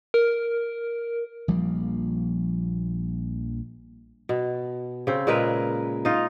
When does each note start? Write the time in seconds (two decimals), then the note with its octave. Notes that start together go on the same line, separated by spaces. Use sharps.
0.14 A#4
1.48 A#1 F3 G3 A#3
4.29 B2
5.07 C#3 C4
5.27 A#2 G#3 A#4 B4
6.05 D#4 F4